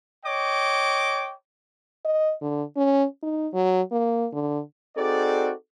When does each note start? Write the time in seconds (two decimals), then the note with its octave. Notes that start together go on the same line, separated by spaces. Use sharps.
0.25 C#5 D#5 G5 D6
2.04 D#5
2.41 D3
2.76 C#4
3.22 D#4
3.53 F#3
3.91 A#3
4.33 D3
4.97 C4 D#4 F#4 G#4 A4 D5